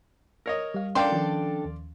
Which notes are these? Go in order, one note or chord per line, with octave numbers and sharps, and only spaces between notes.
A#4 C#5 D#5
G3 F5
C#4 D4 A4 A#4 D5 F5 G5 C6
D#3 F3 C#4
D#2